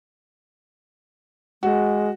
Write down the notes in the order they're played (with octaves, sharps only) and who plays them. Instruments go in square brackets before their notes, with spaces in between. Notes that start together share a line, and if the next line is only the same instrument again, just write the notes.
[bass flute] G#3 [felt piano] F#4